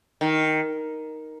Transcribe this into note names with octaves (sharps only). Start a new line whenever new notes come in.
D#3